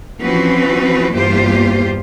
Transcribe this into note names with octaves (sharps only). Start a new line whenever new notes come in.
E3 F3 C4 C#4 F#4 B4
E2 G2 A#3 F4 G4 C5